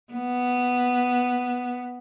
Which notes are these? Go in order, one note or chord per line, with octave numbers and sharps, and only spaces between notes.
B3